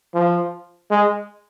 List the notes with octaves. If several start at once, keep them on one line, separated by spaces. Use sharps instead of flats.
F3
G#3